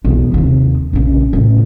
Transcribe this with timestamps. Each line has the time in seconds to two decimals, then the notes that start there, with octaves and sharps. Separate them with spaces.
0.05 B1 E2
0.34 D#2 C3
0.93 A#1 C#3
1.33 A2 C#3